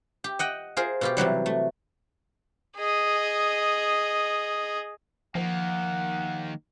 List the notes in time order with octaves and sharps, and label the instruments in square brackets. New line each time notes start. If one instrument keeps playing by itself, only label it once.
[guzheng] G4
D#5 F#5 G5
F4 G#4 A#4 C5
B2 F4 G4
C3 E3 F#3 G3
A3
[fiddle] G#4 D#5
[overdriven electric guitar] D#3 A#3 [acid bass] F3 [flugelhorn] F#5